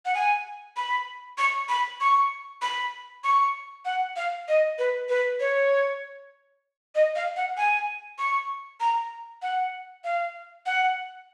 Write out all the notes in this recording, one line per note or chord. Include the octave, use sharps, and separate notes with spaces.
F#5
G#5
B5
C#6
B5
C#6
B5
C#6
F#5
F5
D#5
B4
B4
C#5
D#5
F5
F#5
G#5
C#6
A#5
F#5
F5
F#5